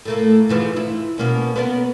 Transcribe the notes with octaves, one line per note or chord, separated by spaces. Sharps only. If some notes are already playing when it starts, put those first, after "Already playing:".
A2 A3 A#3
G#2 E3 F3
E4
B2 A#3 C#4
B3 C4 A#4